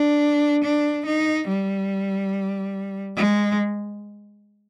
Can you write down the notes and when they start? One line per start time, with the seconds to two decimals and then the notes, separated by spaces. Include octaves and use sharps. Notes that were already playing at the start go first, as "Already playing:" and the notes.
Already playing: D4
0.64 D4
1.06 D#4
1.49 G3
3.17 G#3